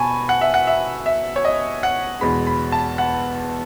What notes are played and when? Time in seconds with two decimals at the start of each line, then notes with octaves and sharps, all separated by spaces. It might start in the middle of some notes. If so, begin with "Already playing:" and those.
Already playing: B2 G#5 A5 B5 C#6
0.29 F#5
0.41 E5
0.54 F#5
0.67 E5
1.06 E5
1.36 C#5
1.45 D#5
1.83 F#5
2.21 E2 B2 G#3 B5
2.47 B5
2.72 A5
2.98 F#5